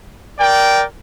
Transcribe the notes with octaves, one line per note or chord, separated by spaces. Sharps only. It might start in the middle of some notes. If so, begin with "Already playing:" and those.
A#4 D5 G5